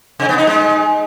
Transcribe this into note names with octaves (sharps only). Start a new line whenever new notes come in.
C3
B3
D#4
G#3